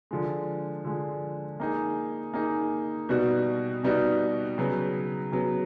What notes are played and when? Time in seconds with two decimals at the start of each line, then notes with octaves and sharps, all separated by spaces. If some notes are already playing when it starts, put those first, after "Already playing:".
0.11 D3 F3 G#3
0.84 D3 F3 G#3
1.60 A#3 D#4 G#4
2.34 A#3 D#4 G#4
3.09 B2 G3 B3 D#4 F#4
3.83 B2 G3 B3 D#4 F#4
4.58 C#3 F#3 B3
5.32 C#3 F#3 B3